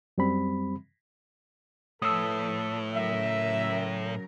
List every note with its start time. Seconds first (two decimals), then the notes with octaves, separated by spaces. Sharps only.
0.18 F#2 G3 C4 B5
2.02 A2 F3 A4 B4 D#6 E6
2.92 C#3 F#3 A#4 E5